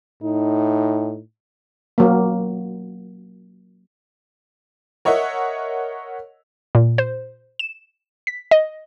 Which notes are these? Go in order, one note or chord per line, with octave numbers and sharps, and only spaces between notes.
A2 D#4
F#3 A#3
A#4 C#5 D#5 E5 F#5
A#2
C5
E7
B6
D#5